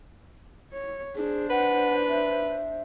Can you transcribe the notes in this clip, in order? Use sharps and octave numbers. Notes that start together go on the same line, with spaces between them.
C#5
D4 G#4 C5
B4 F#5
E5